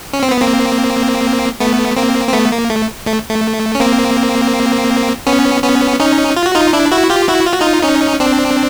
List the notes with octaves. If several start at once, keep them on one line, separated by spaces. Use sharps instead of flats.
C#4
C4
B3
A#3 C4
A3 B3
A#3 C4
C4
A3 B3
A#3
A3
A3
A3
C#4
A#3 C4
B3 C#4
B3 C#4
C#4 D#4
F4
F#4
D#4 F4
D4 E4
E4 F#4
F4 G4
E4 F#4
F4
F#4
D#4 F4
C#4 D#4
C4 D4